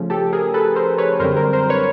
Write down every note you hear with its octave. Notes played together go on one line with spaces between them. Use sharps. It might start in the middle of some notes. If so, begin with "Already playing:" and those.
Already playing: C#3 F3 A3 C#4
G4 A4
G#4 A#4
A4 B4
A#4 C5
B4 C#5
F#2 D3 G3 C4 A#4 C5
A#4 C5
A#4 C5
B4 C#5